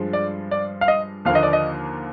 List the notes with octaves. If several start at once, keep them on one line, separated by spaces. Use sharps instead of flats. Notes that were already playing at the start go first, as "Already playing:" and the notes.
Already playing: G2 F3 G#3
D5
D5
F5
D#5
D#2 D3 F3 A#3 F5
D#5
D5
D#5